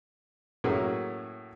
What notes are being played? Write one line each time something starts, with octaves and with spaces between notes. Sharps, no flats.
A2 F#3 A#3 C#4 F#4 G#4